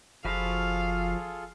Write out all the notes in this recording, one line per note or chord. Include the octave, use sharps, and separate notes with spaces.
F#1 F3 F4 F#4 G#4 A4 F5 B5